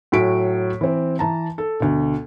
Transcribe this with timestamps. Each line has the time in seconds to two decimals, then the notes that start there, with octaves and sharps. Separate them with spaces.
0.12 A2 F#3 F#4 G#5 B6 D7
0.81 E3 C4
1.19 E3 A5 A#5
1.58 A4
1.80 D2 B2